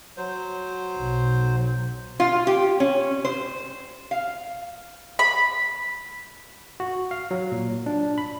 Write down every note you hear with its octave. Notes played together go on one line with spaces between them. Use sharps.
F#3 C5
B1
F4
G4
C#4
C5
F5
B5
F#4
F5
F#3
A#2
D4
B5